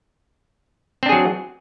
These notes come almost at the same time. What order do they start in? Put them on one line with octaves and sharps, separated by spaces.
C4 D4 G#4 F#3